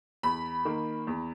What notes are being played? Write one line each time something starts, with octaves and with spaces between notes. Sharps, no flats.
E2 B5
D#3 A#3
E2